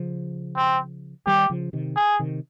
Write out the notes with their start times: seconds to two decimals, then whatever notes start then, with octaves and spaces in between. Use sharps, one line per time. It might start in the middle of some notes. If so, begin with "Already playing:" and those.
Already playing: C#3 F3
0.57 C4
1.26 D#3 G3 G4
1.50 C#3 F3
1.73 C3 D#3
1.96 G#4
2.19 C3 D#3